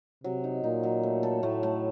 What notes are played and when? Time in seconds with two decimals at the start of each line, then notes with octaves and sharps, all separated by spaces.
0.24 C3 F#3
0.44 D#4
0.64 A#2 D#4
0.83 F#3
1.03 A3
1.23 A4
1.43 A2 A3
1.63 A3